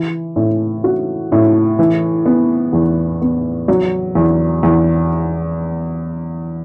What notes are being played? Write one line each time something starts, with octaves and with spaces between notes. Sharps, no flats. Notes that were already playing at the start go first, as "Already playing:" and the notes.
Already playing: E3
A2
F#4
A2
E3
B3
E2
B3
F#3
E2
E2